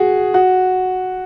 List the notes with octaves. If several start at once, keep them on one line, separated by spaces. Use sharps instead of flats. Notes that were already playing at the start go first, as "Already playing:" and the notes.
Already playing: F#4 G#4
F#4